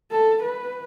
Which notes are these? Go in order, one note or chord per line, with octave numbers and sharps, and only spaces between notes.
A4
B4